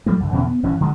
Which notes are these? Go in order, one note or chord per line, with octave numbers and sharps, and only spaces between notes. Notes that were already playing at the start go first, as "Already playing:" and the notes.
F#3 G3 A3 A#3
C2 G2 D3
E2 B2 D3 C#4
B3
G#1 G2 E3 C#4
D3 G3 G#3